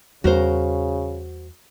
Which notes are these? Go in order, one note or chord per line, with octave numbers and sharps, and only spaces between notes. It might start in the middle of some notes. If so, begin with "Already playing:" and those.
E2 C#3 G3 F#4 A#4 C5